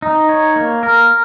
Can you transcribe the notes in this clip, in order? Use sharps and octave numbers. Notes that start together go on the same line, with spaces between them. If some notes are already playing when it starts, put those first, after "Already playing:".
D#4
C#5
A#3
A#4